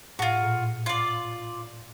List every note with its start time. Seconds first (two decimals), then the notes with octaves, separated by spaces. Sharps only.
0.19 A2 F4 F#4
0.43 A#2
0.86 F4 D5